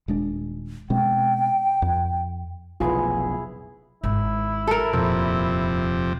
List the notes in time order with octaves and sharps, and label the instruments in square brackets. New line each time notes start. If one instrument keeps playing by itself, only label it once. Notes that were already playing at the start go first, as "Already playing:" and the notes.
[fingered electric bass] D#1 G#3 D4
[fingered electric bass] B2 G#3 C4 [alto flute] G5
[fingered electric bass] F2
[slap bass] F1 B1 [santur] B3 E4 G#4 [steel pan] F4
[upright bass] G#1 [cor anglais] E4
[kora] A4 A#4
[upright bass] D#1 [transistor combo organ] F2 C3